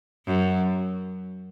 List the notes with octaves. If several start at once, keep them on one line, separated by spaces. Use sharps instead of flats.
F#2